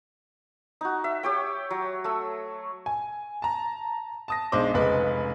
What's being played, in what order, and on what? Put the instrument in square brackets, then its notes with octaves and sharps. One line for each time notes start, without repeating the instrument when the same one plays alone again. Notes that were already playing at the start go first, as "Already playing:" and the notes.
[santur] D#4 F#4
E5
G4 C#5 G5
F#3
A3 E6
[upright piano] G#5
A5 A#5
A5 D#6 A#6
B1 G#3 D4 C5 D6
F1 C#2 G#3 B4